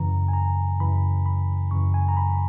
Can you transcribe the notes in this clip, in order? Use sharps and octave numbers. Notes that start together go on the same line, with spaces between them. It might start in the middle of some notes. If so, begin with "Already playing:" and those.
Already playing: F#2 C#3 E3 A#5
G#5
A#5
F#2 C#3 E3 B5
B5
F#2 C#3 E3 C#6
G#5
A#5
B5